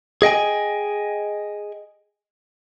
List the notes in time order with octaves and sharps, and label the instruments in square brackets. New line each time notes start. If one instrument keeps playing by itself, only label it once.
[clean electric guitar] G#4 D#5 G5 G#5